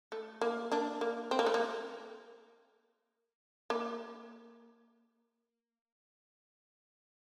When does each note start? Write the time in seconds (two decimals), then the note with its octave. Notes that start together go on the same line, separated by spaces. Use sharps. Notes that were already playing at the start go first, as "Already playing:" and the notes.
0.12 A3
0.41 A#3
0.72 A#3 D4
1.01 A#3
1.31 C4
1.39 A#3
1.46 A3
1.54 A#3
3.70 A#3